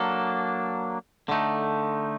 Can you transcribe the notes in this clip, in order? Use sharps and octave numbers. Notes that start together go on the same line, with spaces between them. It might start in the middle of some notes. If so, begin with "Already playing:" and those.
Already playing: F#3 A#3 D4 A4
D3 A3 D#4